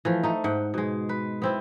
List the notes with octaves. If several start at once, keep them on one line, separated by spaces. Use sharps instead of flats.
E3 F3 A3
A3 D#4
G#2 F#5 G5
B2 G#3
B4
B3 C4 E4